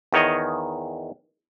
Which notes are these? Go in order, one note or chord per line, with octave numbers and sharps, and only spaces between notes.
E2 D#3 C#5 D#5